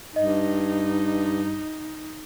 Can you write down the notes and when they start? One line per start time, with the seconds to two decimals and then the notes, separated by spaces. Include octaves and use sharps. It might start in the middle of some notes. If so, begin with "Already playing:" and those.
0.16 G2 D#4 D#5